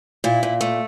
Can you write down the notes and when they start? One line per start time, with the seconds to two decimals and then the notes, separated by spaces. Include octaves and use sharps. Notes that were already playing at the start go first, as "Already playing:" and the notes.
0.24 A#2 E4
0.43 A#2
0.61 A3